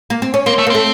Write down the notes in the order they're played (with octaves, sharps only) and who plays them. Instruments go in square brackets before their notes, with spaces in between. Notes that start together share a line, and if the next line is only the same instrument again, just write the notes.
[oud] A#3
C4
C#4
[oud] A#3 [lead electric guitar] C4
[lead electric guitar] A3
[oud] A#3
[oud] A3 [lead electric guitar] C4